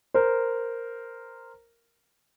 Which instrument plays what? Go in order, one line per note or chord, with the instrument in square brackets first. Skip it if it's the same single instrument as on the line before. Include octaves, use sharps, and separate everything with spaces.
[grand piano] A#4 C5